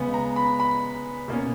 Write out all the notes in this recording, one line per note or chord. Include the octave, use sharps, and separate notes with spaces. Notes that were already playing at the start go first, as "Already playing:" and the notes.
Already playing: C#3 G#3 B3
A#5
B5
B5
B2 A#3 C#4